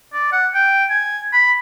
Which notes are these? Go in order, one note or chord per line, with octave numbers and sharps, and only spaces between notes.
D5
F#5
G5
G#5
B5